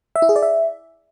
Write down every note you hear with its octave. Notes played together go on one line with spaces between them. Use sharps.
E5
E4
G#4
D5
E5